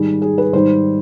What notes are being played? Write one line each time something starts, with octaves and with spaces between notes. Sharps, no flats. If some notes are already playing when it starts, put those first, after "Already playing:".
Already playing: G#2 D#3 G3 G#4
G#4
B4
G#2 D#3 G3 C5